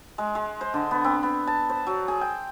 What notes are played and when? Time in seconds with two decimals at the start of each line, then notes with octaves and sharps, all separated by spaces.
0.18 G#3
0.35 G#3
0.61 C5
0.74 D3
0.91 B3
1.04 C4
1.23 B3
1.47 A5
1.70 C5
1.87 F#3
2.08 G#4
2.21 G5